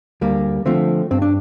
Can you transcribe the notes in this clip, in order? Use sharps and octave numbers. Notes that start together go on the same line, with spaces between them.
D2 G3 A#3
D3 F3 A3 C4
G2 C4
D4